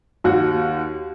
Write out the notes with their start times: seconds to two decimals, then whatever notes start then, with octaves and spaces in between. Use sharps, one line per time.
0.24 D#2 F#4